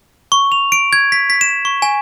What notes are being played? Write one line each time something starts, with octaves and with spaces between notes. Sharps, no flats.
C#6
F7
D7
G#6
B6
B6
E7
C#6
G#5